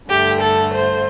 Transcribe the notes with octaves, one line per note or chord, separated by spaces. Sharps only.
G2 D3 A3 G4
A4
C5